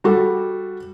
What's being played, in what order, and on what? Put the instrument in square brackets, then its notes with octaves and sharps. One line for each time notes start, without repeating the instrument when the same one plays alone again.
[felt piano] G3 F#4 A4